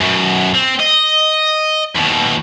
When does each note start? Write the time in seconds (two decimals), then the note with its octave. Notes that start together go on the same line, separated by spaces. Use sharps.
0.01 F#2 B2
0.54 C4
0.80 D#5
1.96 D#2 B2